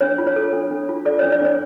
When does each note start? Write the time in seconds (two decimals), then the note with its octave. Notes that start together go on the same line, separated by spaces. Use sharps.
0.01 D4 C#5
0.18 F4
0.27 C#5
0.36 A4
0.53 D4
0.71 D4
0.89 F4
1.05 A4 D5
1.19 C#5
1.23 D4
1.32 D5
1.42 D4 C#5